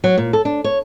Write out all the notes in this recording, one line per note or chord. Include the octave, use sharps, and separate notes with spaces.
F#3
A#2
A4
D4
C#5